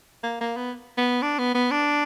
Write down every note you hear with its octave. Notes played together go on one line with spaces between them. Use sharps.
A#3
A#3
B3
B3
D4
B3
B3
D4